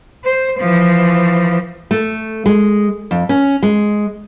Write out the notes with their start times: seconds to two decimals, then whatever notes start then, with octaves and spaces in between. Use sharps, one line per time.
0.24 C5
0.59 E3 F3
1.91 A3
2.46 G#3
3.11 F2
3.29 C#4
3.63 G#3